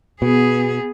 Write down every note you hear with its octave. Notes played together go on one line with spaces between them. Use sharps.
B2 B3 G#4